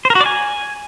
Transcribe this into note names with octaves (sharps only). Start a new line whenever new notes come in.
C5
A#4
F#4
D5
G#5